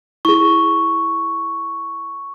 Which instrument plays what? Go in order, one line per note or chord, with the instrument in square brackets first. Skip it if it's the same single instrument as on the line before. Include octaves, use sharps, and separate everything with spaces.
[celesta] E4 G#4 [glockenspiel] C#6